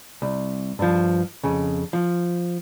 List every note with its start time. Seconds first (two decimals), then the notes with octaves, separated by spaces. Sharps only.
0.22 C2
0.79 G2 F3
1.44 F2 C#3
1.93 F3